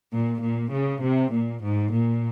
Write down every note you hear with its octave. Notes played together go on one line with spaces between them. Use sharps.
A#2
A#2
C#3
C3
A#2
G#2
A#2